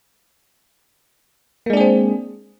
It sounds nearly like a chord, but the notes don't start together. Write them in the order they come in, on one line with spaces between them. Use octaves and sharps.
A#3 G#3 D4 G#4 C4